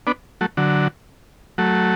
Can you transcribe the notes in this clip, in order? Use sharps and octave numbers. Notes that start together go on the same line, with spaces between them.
B3 D4
F#3 A3
D3 F#3
F#3 A3